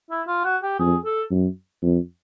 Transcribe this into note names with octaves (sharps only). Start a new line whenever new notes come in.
E4
F4
F#4
G4
F2 G#4
A4
F#2
F2